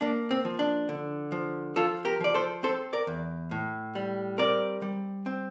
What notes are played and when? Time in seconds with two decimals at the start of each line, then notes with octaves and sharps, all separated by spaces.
0.01 A#3 D4
0.31 C4
0.45 F3
0.59 D4
0.89 D3
1.32 F3
1.76 F3 F4 A4
2.05 G4 A#4
2.20 F3 D5
2.34 A4 C5
2.63 C4 A4 C5
2.93 A#4 D5
3.07 E2
3.51 A2
3.95 G3
4.38 C4 A#4 D5
4.82 G3
5.26 C4